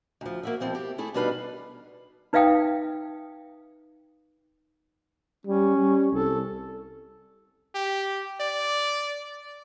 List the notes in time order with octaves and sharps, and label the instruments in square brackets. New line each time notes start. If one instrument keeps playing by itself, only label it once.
[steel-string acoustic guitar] D2 F3
A#3 F#4 E5
B2 F3 C4 E4
G4
A3 E4 G#4 A4
B2 G3 D4 D#4 B4 F5
[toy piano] D#4 B4 E5 F5 G5 D#6
[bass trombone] G3 [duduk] C#4
[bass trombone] G3
[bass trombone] C2 [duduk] A4
[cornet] G4
D5